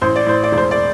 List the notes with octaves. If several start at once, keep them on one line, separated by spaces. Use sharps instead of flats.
A1 C5
D5
A2 C5
D5
E1
C5
D5